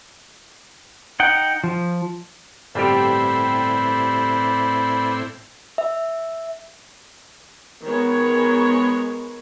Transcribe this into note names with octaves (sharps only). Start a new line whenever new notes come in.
D#4 F#5 G5
F3
G1 A2 G3 C4 E4 G4 B4 D5
E5
D#3 G#3 B3 C#5